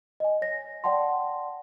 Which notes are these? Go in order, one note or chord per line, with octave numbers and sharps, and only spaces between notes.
D#5 G#5
C#5 A#6
D5 F#5 G5 A5 C6